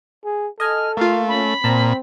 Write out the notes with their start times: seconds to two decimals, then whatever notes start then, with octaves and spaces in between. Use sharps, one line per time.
0.25 G#4
0.60 A4 D#5 G#5 F6
0.97 A3 A#3 F4 F5
1.28 C#4 B5
1.64 A#2 C4 A5 A#5